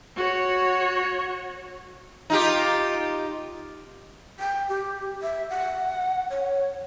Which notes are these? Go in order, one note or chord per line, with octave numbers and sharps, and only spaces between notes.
F#4 C#5
D#4 F4 G4
G5
G4
E5
F#5
C#5